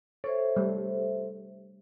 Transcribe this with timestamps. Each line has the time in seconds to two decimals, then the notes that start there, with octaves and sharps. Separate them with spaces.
0.24 A4 C5 C#5 E5
0.56 G3 A3